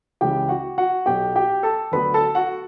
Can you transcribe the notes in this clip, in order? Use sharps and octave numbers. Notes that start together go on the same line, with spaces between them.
C#2 C#3 E3 G4 G5
F#4 F#5
F#4 F#5
B1 B2 F#3 G4 G5
G4 G5
A4 A5
D2 D3 F#3 B3 B4 B5
A4 A5
F#4 F#5